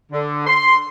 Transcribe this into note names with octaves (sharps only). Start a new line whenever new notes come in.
D3
C6